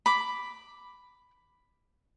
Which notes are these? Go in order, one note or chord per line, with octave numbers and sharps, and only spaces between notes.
B5 D6